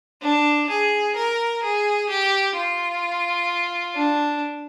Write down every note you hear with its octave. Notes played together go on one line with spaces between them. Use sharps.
D4
G#4
A#4
G#4
G4
F4
D4